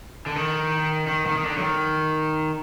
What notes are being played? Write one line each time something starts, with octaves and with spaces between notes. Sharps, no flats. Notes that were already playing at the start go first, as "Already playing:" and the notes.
D3
D#3
D#3
D#3
D#3
D3
F#3
D#3